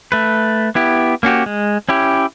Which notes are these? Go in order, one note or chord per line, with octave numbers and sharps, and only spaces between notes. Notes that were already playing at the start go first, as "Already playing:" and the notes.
A3 B4
B3 E4 G4
A#3 C#4 F#4 G4
G#3
C#4 E4 G4